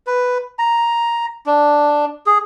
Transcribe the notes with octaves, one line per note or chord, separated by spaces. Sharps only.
B4
A#5
D4
G#4